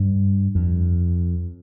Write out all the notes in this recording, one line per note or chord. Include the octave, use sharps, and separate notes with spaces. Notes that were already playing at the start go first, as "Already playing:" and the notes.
Already playing: G2
F2